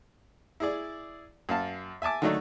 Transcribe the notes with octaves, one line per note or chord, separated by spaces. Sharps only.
E4 G#4 D5
F#2 F5 A5
E5 G#5 A5 D6
D3 D#3 F#3 A3 D4 D#4